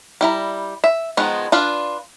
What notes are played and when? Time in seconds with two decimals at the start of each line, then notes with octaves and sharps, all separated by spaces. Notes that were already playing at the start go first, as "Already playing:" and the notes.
0.21 G3 E4 A#5
0.84 E5
1.17 D#3 F3 G#3 B3 D#4
1.52 D4 F4 B4